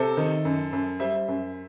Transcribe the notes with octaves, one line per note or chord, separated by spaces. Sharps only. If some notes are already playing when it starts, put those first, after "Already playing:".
Already playing: C3 A4 C5
D#3
F#2
F#2
G3 C5 E5
F#2